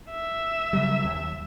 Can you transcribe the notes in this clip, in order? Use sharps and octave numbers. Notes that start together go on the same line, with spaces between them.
E5
C#3 F#3 G3
D#2